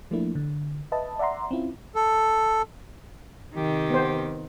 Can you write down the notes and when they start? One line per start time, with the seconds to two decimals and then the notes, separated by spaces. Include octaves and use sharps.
0.11 F3 A3 A#3 D4 E4
0.35 D3
0.92 B4 D#5 E5 A5
1.19 D5 E5 F#5 A#5 C6
1.51 C4 C#4 E4 F4
1.95 A4
3.55 C3 D#3 G4
3.90 B3 C5